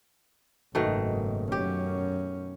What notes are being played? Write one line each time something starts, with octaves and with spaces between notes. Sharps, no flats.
F#1 G#2 B2 D#3 A3
F#2 C#4 G4